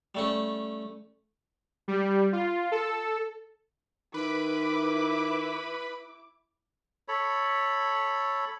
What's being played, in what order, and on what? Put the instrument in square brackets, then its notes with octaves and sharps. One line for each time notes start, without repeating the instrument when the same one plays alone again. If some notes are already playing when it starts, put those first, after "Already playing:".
[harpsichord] G3 A3 C#4
[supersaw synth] G3
F4
A4
[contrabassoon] D#3 [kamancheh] E4 D6 [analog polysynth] B4 B5
[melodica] A4 C#5 B5